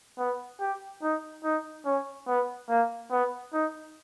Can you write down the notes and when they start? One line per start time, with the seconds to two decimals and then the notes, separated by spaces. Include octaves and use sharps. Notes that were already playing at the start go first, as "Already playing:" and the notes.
0.18 B3
0.60 G4
1.02 D#4
1.44 D#4
1.86 C#4
2.27 B3
2.69 A#3
3.11 B3
3.53 D#4